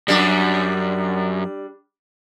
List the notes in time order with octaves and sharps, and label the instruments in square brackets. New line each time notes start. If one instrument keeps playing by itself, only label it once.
[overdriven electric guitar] F#2 [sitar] G3 D4